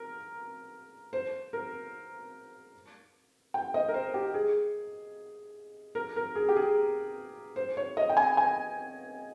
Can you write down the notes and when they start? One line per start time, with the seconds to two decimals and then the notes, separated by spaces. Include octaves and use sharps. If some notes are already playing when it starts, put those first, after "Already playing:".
Already playing: A#4
1.13 C5
1.53 A#4
3.54 G5
3.74 D#5
3.88 A#4
3.94 C5
4.14 G4
4.34 G#4
5.95 A#4
6.16 A#4
6.35 G#4
6.48 G4
6.56 G#4
7.56 C5
7.77 C#5
7.97 D#5
8.10 G5
8.17 G#5
8.37 G#5